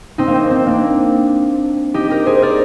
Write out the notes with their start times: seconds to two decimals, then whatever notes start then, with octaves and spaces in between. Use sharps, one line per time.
0.18 C4 D#4
0.27 A#3
0.35 C4
0.50 C4
0.66 A#3 D4
1.94 D#4 G4
2.10 G4 A#4
2.26 G#4 C5
2.42 A#4 D5